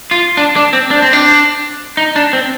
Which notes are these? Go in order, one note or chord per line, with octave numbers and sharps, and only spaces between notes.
F4
D4
D4
C4
D4
C4
D4
D#4
D4
C4